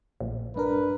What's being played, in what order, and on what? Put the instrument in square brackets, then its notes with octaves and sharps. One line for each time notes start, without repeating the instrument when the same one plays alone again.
[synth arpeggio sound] A#1
[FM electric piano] G2 D4 A#4 [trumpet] B4